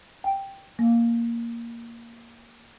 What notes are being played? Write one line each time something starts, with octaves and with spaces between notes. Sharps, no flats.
G5
A#3